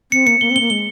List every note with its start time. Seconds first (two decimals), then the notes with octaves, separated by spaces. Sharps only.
0.12 C4 C#7
0.27 A#3 C#7
0.41 A#3 G7
0.51 C4
0.56 A#3 G7
0.70 G#3 G7